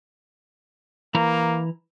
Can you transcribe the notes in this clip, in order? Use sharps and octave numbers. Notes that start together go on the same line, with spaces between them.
E3 A#3 E4 A#5